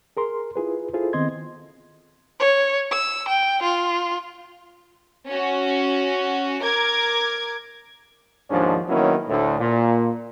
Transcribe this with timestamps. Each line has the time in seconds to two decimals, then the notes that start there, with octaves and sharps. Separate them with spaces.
0.17 G#4 A#4 C6
0.56 E4 F4 G#4 B4
0.94 E4 F4 G#4 A4 C5
1.13 D#3 B3 C4 D#5 C6 G#6
2.39 C#5
2.91 E6
3.28 G5
3.62 F4
5.27 C#4 F#4
6.63 A#4 D6 G#6
8.50 D#2 G#2 F3 C#4 D4
8.88 D#3 F#3 A#3 B3 C#4 E4
9.28 D2 A2
9.60 A#2